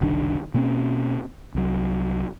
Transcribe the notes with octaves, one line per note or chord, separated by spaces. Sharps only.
F#1 C2 D#3 D4
B2 A#3 C4 C#4
C2 F#3